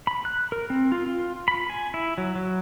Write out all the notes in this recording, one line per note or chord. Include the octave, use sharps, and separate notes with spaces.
B5
F#6
A#4
C4
F4
F4
B5
G#5
E4
F#3
F#3